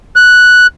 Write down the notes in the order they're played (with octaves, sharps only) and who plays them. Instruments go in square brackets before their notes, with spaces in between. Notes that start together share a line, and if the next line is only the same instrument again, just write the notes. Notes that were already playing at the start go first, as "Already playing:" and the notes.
[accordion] F#6